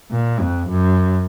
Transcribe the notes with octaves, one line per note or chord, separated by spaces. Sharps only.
A#2
F2
F#2